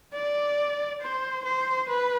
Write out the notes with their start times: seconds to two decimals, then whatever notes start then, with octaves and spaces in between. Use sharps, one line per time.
0.13 D5
1.01 C5
1.44 C5
1.88 B4